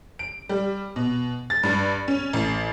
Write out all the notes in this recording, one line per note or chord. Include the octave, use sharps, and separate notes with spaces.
D7
G3
B2
A6
G2
C#4
A1